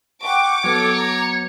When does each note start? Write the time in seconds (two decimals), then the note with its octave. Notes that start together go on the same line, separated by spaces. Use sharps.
0.23 F#5 G5 C#6 D6
0.64 F#3 B3 A4 C#5
0.95 A#5